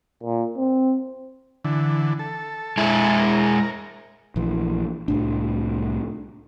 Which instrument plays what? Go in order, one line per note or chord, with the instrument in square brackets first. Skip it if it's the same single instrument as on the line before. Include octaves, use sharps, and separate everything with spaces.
[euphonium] A#2
C4
[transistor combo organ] D3 E3
A4
[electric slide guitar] G#3 E4 G#4
[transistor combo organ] A#4
[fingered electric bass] A#1 E3
C2 A2 D4